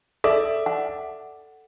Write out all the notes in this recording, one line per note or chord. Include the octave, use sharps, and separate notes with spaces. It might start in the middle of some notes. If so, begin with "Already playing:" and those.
A4 D5 E5
F#5